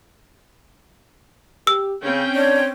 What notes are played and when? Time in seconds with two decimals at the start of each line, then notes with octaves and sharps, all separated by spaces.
1.67 G4 E6
2.03 C#3 C4 C#4 G5
2.35 D4 C#5